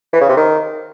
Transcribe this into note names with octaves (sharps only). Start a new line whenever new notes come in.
E3
C#3
C3
D#3